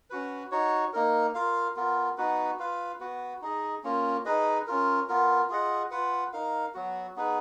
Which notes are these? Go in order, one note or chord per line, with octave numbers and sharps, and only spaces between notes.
C#4 F#4 B4
D#4 F#4 C#5
A#3 D#4 A#4
F4 A#4 F5
B3 F4 A#4
B3 D#4 F#4 B4
F4 B4 F5
B3 F#4 B4
D#4 G#4 D#5
A#3 C#4 F4
D#4 G#4 B4 D#5
C#4 F4 A#4
B3 F4 A#4
F4 G#4 D#5 F#5
F4 B4 F#5
D#4 A#4 F5
F#3 B3 F#4
B3 D#4 G#4 B4